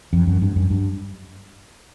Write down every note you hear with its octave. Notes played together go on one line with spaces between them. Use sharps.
F2
F#2
G2
F#2
G2